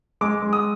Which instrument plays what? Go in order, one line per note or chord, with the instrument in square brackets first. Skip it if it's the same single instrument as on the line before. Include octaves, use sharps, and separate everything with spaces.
[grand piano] G#3 D6
G#3
D#6